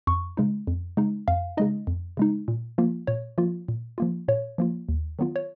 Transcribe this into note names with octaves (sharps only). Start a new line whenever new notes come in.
F2 C#6
C#3 G#3 D#4
F2
C#3 G#3 D#4
F2 F5
C#3 G#3 D#4 D#5
F2
C#3 G#3 D#4
A#2
F3 A#3 F4
A#2 C#5
F3 A#3 F4
A#2
F3 A#3 F4
A#2 C#5
F3 A#3 F4
D#2
D#3 F#3 B3 F4
C#5